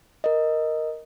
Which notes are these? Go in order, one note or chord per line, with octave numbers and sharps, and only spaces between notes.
A#4 D#5